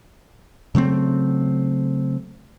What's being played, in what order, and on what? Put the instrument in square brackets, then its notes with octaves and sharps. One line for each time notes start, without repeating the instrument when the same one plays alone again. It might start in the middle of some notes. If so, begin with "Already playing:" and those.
[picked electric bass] C#3 F#3 A3 C4